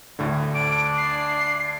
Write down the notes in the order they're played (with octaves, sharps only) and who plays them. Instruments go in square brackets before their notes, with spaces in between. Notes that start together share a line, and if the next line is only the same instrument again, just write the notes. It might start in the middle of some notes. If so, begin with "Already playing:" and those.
[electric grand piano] D2 A2 D3
[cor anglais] D4 [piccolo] D7
[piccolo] C7